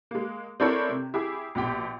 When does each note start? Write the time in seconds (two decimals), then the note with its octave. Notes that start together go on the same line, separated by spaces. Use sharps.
0.11 G#3 A#3
0.60 C4 D4 E4 A4 A#4 C#5
0.89 C3
1.14 E4 G4 G#4
1.55 A#1 B2 G4 G5